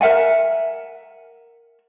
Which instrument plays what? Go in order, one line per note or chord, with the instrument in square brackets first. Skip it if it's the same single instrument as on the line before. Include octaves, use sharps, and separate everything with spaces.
[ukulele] A#4 E5 F#5 G#5